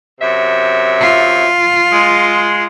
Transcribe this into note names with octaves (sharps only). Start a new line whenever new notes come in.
F#2 C3 E5
F4
G#3